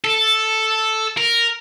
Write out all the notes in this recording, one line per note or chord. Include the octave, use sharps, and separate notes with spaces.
A4
A#4